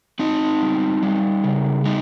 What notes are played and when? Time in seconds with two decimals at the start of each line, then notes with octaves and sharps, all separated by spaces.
0.19 C4 D#4
0.61 G3
1.03 G3
1.44 C#3
1.85 G3 D#4